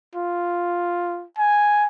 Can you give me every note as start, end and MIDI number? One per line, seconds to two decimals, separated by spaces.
0.15 1.25 65
1.38 1.87 80